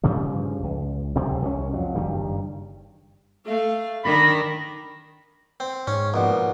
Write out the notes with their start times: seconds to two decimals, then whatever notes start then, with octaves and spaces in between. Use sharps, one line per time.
0.03 G2 C#3 F3 G3
0.62 C#2
1.16 D1 C3 F#3 C4
1.42 C2 C#4
1.73 F2 F#3
1.95 F#1 G2 D#3 G3
3.46 A3 F5
4.04 D#3 D4 A#4 B5
5.60 C4
5.87 G#2 C#4
6.14 A#1 B2